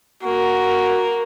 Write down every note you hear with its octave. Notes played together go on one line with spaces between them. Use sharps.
A#3 F#4